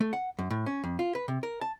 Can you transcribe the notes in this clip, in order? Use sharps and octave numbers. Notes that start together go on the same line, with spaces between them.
A3
F#5
F#2
A2
C#4
F2
F4
B4
C3
A#4
A5